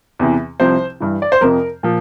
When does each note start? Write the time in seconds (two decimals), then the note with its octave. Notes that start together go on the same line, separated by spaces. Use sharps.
0.19 E2 C3 E3
0.60 C2 C3 F3 C5
1.00 G2 E3
1.22 D5
1.32 C5
1.41 F2 C3 F3 A#4
1.83 A#2 F3